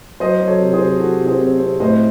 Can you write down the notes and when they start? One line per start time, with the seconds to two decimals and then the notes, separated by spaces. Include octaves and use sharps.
0.20 F#3 C5 D#5
0.41 F#3
0.47 A4 C#5
0.60 C3
0.73 G#4 C5
0.81 C3
1.00 F#3 F#4 A4
1.20 C3
1.27 G#4 C5
1.40 C4
1.60 C4
1.80 A2 C5 D#5